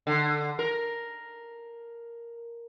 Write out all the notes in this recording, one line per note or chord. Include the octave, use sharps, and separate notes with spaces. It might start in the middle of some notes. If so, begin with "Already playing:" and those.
D3
A#4